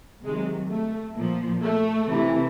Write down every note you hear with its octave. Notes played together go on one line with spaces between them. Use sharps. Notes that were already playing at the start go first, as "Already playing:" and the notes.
C3 D#3 F#3 G#3
A3
A#2 F3
A3
C3 E3